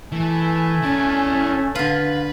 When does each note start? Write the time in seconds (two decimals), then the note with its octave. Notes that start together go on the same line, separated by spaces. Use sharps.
0.12 E3 A3 G#5
0.83 C#4 E4 D5
1.75 D3 F4 B4 F5